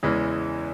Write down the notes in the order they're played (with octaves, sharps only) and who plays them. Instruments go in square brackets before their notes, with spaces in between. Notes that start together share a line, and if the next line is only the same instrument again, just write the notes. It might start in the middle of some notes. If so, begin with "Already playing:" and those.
[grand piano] E2 C#3 E3 G#3